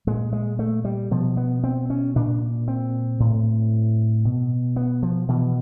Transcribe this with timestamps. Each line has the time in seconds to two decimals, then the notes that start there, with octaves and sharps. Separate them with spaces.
0.07 A#2 G#3
0.33 G#3
0.59 A3
0.85 G3
1.11 B2 F3
1.37 B3
1.64 C4
1.90 C#4
2.16 A#2 D4
2.68 C4
3.20 A2
4.25 B2
4.76 B3
5.03 F3
5.28 B2 E3